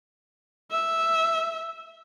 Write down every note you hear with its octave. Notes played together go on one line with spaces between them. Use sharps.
E5